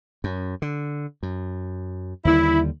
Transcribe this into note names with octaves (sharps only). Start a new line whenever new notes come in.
F#2
D3
F#2
D#2 D3 G3 E4